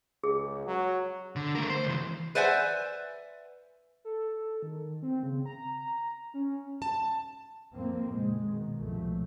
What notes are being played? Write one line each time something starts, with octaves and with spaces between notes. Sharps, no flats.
C#2 G#4
F#3
D3
A3 A#4
C5
C#2 E3
B4 C5 D5 E5 F#5 G#5
A4
D#3
C4
C#3
A#5
C#4
A5
F2 A2 F3 A#3 C4
A#2 C#3 G#3
B2 D#3
C2 F#2 A#2 F3 A3